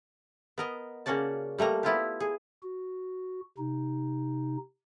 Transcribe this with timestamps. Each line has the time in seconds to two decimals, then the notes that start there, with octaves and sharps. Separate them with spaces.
0.58 B3 A#4 D#5
1.06 C#3 A#3 C#4 F#4 D5 A5
1.58 G3 A3 A#3 A#5
1.83 B3 E4 F4 G4
2.20 G#4
2.63 F#4
3.58 C3 D#4